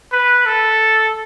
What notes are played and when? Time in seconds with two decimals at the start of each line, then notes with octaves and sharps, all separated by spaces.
0.12 B4
0.46 A4